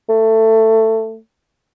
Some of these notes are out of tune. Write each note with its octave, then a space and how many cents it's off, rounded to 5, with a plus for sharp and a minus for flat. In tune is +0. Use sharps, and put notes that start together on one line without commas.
A3 +15